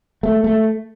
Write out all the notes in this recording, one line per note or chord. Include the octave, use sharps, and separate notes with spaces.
A3
A3